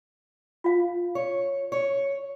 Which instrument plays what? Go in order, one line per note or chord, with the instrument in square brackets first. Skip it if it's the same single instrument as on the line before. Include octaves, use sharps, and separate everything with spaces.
[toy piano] F4 F5
[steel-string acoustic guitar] C#5
C#5